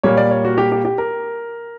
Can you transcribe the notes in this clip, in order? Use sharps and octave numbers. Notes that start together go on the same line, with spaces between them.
A#2 G3 A#3 C#5
D5
C#5
F#4
G4
G4
G4
A#4